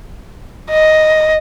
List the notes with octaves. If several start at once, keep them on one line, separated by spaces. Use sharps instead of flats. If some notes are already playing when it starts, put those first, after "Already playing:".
D#5